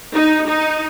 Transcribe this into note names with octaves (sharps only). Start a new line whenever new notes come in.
D#4
D#4